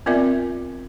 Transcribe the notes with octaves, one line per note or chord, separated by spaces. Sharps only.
B3 C4 F4 A#4 D5 E5